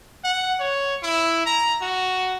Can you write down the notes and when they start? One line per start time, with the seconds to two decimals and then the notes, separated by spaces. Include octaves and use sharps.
0.24 F#5
0.60 C#5
1.03 E4
1.46 A#5
1.82 F#4